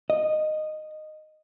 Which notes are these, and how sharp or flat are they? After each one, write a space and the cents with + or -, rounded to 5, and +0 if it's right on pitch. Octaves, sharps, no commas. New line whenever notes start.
D#5 -10